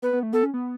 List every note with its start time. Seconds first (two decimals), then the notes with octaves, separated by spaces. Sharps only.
0.02 B3 B4
0.13 B3
0.23 A3
0.33 B3 A4
0.43 C#4
0.54 B3